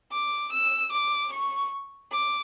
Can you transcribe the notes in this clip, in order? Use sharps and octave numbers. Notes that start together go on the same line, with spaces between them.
D6
E6
D6
C#6
D6